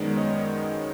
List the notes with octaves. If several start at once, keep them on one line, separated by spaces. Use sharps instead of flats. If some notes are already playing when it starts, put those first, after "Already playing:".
Already playing: F#2 D#3 G#3 B3 C5 D5
C#5 D#5